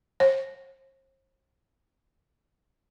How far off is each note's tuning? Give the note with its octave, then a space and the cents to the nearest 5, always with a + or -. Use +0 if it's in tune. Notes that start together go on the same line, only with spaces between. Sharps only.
C5 +40